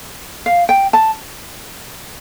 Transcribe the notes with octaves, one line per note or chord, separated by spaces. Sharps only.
F5
G5
A5